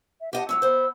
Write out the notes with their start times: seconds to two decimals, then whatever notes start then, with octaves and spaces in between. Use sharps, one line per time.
0.21 E5
0.33 G4 D#5 F#5 A5
0.49 F#3 G#3 C#4 E6
0.62 B3 C5